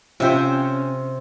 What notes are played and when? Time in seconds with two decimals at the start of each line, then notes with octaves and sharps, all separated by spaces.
0.20 C3 C#4 F4 C5 E5 G5